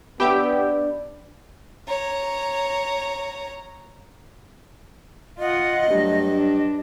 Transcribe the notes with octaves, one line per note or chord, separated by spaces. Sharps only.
B3 D4 G4 E5 G5 B5
C#5 A#5
F4 D#5 F#5
G2 F#3 A3
D4